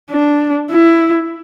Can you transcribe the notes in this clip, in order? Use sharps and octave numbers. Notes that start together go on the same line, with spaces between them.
D4
E4